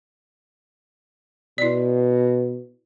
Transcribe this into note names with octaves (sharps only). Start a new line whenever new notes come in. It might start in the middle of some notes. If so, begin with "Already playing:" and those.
B2 E4 D5